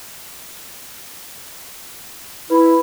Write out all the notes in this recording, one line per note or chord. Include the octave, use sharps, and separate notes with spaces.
E4 B4 B5